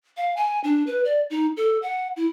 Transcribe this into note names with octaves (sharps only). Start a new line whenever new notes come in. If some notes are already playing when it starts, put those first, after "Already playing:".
F5
G#5
D4
B4
D5
D#4
A4
F#5
E4